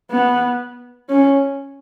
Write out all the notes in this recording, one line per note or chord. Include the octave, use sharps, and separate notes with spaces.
B3
C#4